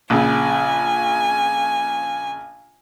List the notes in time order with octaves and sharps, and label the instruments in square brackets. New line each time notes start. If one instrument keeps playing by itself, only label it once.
[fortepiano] A#1 A#2 C#3 [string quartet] G#5